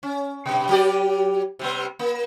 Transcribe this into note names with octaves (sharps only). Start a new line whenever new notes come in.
C#4
G2 B2
F#3 G4 D5
C3 G3 B3
A#3